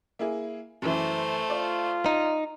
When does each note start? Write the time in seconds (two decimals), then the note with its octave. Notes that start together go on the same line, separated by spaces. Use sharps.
0.19 A#3 E4 G#4
0.82 F#2 E3 A3 C5
1.50 F4 D5
2.06 D#4